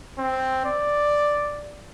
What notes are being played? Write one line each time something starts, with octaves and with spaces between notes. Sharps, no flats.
C4
D5